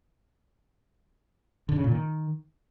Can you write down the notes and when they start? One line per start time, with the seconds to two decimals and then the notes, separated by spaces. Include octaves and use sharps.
1.69 D3
1.76 C#3
1.84 A#2
1.92 D#3